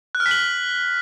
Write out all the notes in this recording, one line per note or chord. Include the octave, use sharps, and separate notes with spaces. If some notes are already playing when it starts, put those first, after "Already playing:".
F#6
F6
B6
F#7